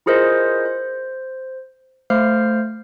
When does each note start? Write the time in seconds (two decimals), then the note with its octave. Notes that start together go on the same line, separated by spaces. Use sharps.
0.06 E4 F4 G#4 A#4 C5 D#5
0.65 C5
2.10 A3 C5 F5 F6